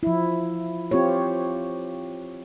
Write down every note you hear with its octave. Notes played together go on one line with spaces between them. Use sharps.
F3 E4
C4 F4 G4 C#5